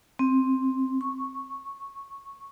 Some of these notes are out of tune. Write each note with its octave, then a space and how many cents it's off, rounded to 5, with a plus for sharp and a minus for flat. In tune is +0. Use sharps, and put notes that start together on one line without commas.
C4 +5
C#6 -10